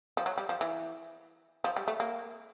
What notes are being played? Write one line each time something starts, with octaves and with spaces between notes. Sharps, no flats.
F3
F#3
G3
F3
E3
F3
G3
A3
A#3